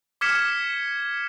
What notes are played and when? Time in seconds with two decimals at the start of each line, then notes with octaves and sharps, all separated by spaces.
0.21 D6 F6 G#6 B6 C#7 E7